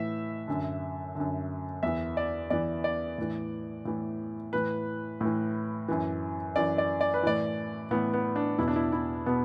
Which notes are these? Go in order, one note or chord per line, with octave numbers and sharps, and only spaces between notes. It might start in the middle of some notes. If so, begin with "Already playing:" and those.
Already playing: A2 E3 E5
F#2 D3
F#2 D3
E2 E3 E5
D5
E2 E3 D5
D5
A2 E3
A2 E3
A2 E3 B4
A2 E3
F#2 E3
F#2 E3 D5
D5
D5
B4
A2 E3 D5
A2 E3 B3
B3
D4
E2 B2 E4
D4
E4
E4
B2 B3